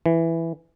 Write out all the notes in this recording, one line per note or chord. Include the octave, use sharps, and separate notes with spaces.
E3